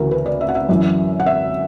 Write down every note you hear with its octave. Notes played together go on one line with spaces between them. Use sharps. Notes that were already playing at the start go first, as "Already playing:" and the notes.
Already playing: D2 C#3 E3 F#4 A#4
B4
D5
E5
F#5
E5
F#2 E3
F#5
E5